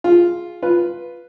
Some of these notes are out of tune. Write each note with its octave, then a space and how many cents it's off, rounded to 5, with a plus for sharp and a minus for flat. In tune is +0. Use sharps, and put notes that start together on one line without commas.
F4 +0 G#4 +0
F4 +0 B4 +0